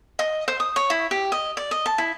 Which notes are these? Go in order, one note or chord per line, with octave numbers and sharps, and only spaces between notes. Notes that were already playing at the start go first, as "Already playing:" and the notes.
D#5
C5
D#6
C#5
E4
G4
D#5
D5
D#5
A5
E4